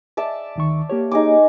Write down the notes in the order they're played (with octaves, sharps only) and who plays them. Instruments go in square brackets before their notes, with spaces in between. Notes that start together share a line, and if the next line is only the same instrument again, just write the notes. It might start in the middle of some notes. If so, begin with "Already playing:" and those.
[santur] D5 E5 A5
[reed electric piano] D2 D#3 C#6
A#3 G4 C#5
[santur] D#4 G#4 D6